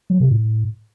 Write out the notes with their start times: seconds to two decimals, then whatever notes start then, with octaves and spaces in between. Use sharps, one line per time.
0.10 F#3
0.20 C3
0.31 A2